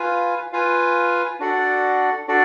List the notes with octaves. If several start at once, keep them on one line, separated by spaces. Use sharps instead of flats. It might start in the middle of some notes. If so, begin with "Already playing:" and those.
Already playing: F4 B4 F5 G#5
F4 B4 F5 G#5
D4 F#4 A4 D5 F#5
D4 F#4 A4 D5